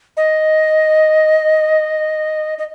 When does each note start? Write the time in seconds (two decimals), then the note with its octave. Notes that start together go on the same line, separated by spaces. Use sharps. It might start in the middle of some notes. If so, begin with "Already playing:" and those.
0.17 D#5
2.58 D#5